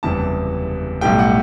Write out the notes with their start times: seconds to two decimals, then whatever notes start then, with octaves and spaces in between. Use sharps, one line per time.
0.03 F#1 E2 C3 E3 G3 A5
1.01 B1 A2 G3 G5
1.19 F#5